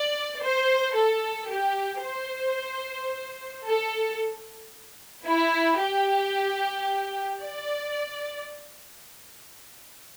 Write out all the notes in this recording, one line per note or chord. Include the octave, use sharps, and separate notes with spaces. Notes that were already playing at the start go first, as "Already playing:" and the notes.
Already playing: D5
C5
A4
G4
C5
A4
E4
G4
D5